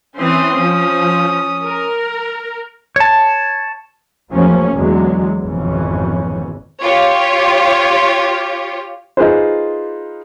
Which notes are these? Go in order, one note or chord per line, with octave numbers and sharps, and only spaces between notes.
E3 C4 C#4 C6 D#6
F3
A#4
C#5 A5
E2 F3 F#3 A3 A#3 C#4
E2 D3 F#3 G#3
G#1 F2 B2 E3 C#4
F4 G4 C#5
D#4 F4 G#4 B4 C5